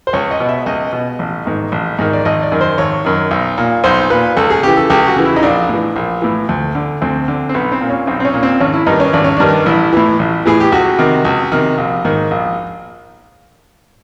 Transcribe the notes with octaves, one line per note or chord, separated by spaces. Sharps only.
C5
C#2 C#5
D#5
B2
E5
C#2 D#5
B2
A1
G#2 D#3
A1
G#2 D#3
D5
G#1 D#5
D5
F#2 D#3
C5
G#1 C#5
F#2 D#3
B1
A#2
B1 C5
A#2 B4
C#2 A4
G#4
C#3 E3 G4
A4
C#2 G4
F#4
C#3 E3
E4
D#4
A#1 D4
A2 E3
A#1
A2 E3
D2
D3
D2 C4
D3
C4
B1 B3
C4
A#2
C#4
B1 C4
C4
C#4
A#2
C4
G#1 C#4
E4
G2 D#3 D#4
C#4
G#1 D4
C#4
G2 D#3 D4
A1 E4
A2 E3
A1
A2 E3 G#4
G4
C#2 F#4
C3 D#3
C#2
C3 D#3
A#1
G#2 D#3
A#1